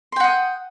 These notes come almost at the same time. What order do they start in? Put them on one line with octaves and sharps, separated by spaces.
C6 G5 F#5 D#6